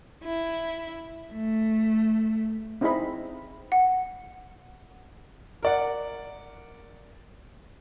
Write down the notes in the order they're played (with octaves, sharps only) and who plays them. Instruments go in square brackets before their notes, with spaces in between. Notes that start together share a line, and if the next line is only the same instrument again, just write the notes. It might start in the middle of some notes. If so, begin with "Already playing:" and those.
[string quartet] E4
A3
[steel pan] C4 D#4 E4 G#4 D#5 B5
[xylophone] F#5
[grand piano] A#4 D5 F#5